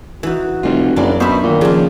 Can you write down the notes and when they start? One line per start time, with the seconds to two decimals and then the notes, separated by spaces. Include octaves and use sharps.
0.23 E3 D#4 F#4
0.63 F1 C3 G3 F4
0.96 F#1 F#2 F#3 D4 D5
1.20 B2 C5 E5
1.43 A#2 D#3
1.61 C#3 F3 D4